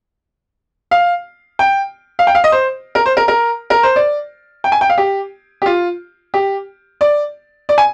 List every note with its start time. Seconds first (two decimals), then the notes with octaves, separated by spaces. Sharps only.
0.91 F5
1.59 G5
2.19 F5
2.27 G5
2.35 F5
2.44 D#5
2.52 C5
2.95 A#4
3.06 C5
3.17 A#4
3.28 A#4
3.70 A#4
3.83 C5
3.96 D5
4.64 G5
4.72 G#5
4.81 G5
4.90 F5
4.98 G4
5.62 G4
5.66 F4
6.34 G4
7.01 D5
7.69 D5
7.78 G#5